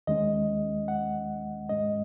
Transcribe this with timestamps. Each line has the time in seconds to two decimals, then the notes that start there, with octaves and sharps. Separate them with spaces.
0.07 D#2 D#3 G#3 C#4 D#5
0.88 F#5
1.69 G#2 G#3 C#4 D#5